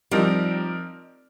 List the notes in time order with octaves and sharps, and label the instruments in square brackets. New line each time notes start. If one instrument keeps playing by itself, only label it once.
[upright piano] F3 C4 D#4 A#4 [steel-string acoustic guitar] G3